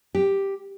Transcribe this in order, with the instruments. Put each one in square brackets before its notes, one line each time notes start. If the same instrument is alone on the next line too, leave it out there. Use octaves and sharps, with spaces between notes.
[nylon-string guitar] G4